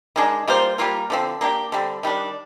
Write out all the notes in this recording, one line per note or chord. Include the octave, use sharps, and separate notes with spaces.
D#3 G#3 D4
G3 A#3 F4 C5
G3 A#3 F4 A#4
D3 F3 C4
A#3 D4 G4
D3 G3 C4
D#3 G3 D4